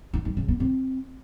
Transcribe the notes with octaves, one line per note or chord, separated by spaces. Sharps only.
D#4
G3
C#3
B3
C4